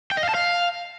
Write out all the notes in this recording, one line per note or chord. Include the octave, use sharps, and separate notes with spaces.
G5
D#5
F5
A5
F5